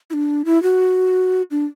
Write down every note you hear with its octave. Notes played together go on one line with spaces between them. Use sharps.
E4
D4
E4
F#4
D4